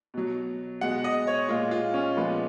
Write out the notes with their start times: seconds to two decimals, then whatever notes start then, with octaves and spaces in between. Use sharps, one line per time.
0.14 B2 F#3
0.81 B2 G#3 F#5
1.04 D#5
1.27 C#5
1.49 A#2 G#3 F4
1.71 F4
1.94 C#4
2.17 A#2 F3 G#3 B3